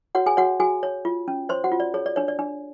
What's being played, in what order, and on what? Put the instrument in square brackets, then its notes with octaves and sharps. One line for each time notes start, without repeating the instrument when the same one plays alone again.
[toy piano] F#4 C#5 F#5
G#4 G#5
F#4 C#5 F#5
F#4 G#4 G#5
C#5
F4
C#4
C5 C#5 C6
F#4 F#5
F4
D5
G#4 C#5
D5
D4 C#5
D5
D4